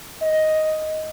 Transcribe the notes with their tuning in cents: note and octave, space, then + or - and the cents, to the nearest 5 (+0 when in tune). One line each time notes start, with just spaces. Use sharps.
D#5 +5